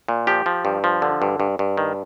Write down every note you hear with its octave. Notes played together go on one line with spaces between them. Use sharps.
A#2
F3 G4
F3
G2
F3
D3
G2
G2
G2
D#3